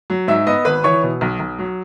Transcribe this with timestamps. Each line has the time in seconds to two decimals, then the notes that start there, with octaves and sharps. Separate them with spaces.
0.10 F#3
0.28 G#2 E5 E6
0.47 B3 D#5 D#6
0.65 G#1 B4 B5
0.84 E3 C#5 C#6
1.03 B2
1.21 B1
1.39 B1
1.59 F#3